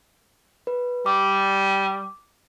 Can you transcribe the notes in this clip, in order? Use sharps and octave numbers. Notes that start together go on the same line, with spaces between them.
B4
G3 D6